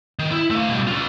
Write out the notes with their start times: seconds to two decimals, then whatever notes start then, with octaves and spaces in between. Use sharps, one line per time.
0.19 D#3
0.32 E4
0.51 A3 F5
0.69 B2 G3
0.87 C#4 F4